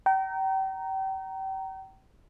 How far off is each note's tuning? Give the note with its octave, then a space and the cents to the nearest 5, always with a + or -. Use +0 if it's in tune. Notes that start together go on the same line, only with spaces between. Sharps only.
G5 -35 A#5 -5